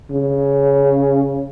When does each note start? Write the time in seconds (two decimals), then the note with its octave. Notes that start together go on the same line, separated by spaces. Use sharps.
0.11 C#3